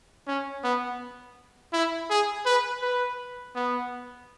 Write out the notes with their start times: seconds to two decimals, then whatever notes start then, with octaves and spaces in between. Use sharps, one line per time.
0.28 C#4
0.64 B3
1.73 E4
2.10 G#4
2.46 B4
2.82 B4
3.55 B3